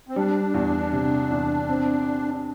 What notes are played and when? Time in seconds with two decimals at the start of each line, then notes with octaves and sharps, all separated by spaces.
0.09 C4
0.16 G3 D4
0.54 E2
0.93 C3
1.31 E2
1.69 C4